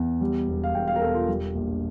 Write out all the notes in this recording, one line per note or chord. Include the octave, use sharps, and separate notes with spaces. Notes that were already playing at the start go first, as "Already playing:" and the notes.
Already playing: E2
G3
E1
F5
E1 G5
F5
A#4
E1 A4
F4
G3
A#1